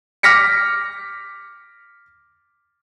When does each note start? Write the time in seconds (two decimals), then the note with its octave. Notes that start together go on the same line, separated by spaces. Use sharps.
0.23 D6 F6 A#6 B6 C#7